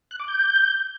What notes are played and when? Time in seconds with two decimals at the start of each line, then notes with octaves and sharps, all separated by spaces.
0.11 F#6
0.19 D6
0.28 G6